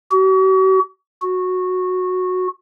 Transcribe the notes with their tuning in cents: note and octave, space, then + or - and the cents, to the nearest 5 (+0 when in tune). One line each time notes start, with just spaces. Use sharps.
F#4 +45
F#4 -10